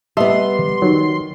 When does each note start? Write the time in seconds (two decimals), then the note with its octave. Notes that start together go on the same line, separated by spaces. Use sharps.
0.17 G3 B3 D#5 E5 A5 C6
0.82 D#3 F#3